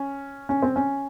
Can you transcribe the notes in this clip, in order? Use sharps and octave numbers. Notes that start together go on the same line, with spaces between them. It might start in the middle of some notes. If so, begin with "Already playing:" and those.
Already playing: C#4
C#4
C4
C#4